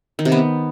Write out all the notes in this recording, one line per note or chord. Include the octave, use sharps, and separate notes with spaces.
D#3
C3
B3